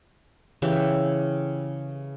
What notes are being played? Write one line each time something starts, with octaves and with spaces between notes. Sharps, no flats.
C#3 E3 G4 E5